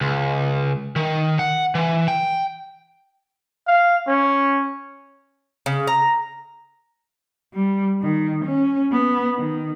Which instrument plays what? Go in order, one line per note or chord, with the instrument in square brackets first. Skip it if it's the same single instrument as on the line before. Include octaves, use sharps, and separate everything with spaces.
[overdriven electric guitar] C#2
D#3
F#5
E3
G5
[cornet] F5
C#4
[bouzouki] C#3
A#5
[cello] G3
D#3
C#4
B3
D#3